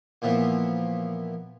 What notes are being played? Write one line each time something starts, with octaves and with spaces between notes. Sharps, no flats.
A#2 E3 F3 B3